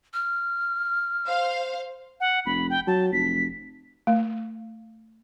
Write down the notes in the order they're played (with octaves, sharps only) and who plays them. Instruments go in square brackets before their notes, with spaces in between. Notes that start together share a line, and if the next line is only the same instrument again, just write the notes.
[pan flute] F6
[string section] C5 F5
[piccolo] F#5
[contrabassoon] F1 [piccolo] B5
[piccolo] G5
[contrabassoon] F#3 [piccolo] A5
[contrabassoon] F1 [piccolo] B6
[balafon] A3